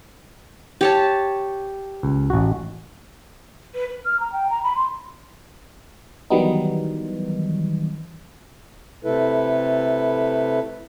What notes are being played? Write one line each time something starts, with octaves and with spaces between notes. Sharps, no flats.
G4 C#5 A5
C#2
A1 F#4
B4
B4
F6
A#5
G5
A#5
B5
C6
D#3 E3 F#3 G3 B3 D#4
C3 A3 E4 A4 B4